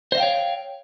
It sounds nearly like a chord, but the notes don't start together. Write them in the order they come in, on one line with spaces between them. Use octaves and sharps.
C5 D#5 F5 G5 C#5